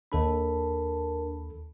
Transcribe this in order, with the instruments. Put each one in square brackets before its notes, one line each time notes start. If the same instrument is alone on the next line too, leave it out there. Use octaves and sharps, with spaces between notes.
[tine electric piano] D#2 A4 B5 [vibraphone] D4 A#4 A5